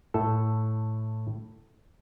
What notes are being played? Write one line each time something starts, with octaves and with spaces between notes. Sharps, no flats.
A2 E4 A4